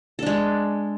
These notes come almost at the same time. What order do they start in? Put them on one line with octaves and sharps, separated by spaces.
A4 D4 G#3